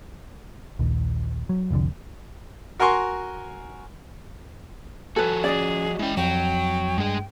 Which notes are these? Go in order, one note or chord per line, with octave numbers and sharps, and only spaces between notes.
A#1 D#2
F#3
F1 C2 F2 D3
F#4 A#4 G#5 C6 C#6
F3 F#4 A4 B4 G#5
C#4 G#4 D5 D#5
G#3 C#4 E4 G5
F2 F#3 G5
G2 G#3 G#4